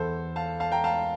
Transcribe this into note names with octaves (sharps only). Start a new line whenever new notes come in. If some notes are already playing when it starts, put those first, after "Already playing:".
Already playing: E2 E3 A4 C5
F5 A5
F5 A5
G5 A#5
F5 A5